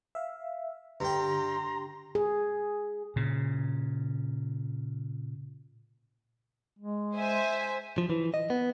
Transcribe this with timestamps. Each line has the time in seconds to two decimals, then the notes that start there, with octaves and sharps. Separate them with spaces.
0.15 E5 F5
1.00 G2 D3 G4 G5 A#5 C6
2.15 G#4
3.16 A#2 C#3
6.79 G#3
7.17 C5 E5 G#5
7.98 F3
8.10 E3
8.34 D#5
8.50 B3